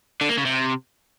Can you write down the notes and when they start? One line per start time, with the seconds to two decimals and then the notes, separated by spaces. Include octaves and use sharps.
0.21 D3
0.29 A#3
0.37 C#3
0.46 C3